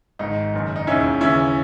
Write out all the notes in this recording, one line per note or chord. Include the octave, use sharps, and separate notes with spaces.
G#1 G#2 D#3 D#4
F#1 F#2 D#3
D#4
E1 D#2 D#3 C#4 E4
D#2 C#3 E3 C#4 E4